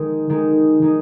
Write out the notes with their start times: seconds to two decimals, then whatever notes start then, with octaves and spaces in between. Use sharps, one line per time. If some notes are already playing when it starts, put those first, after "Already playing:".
Already playing: D#3 G#3 D#4
0.30 D#3 G#3 D#4
0.82 D#3 G#3 D#4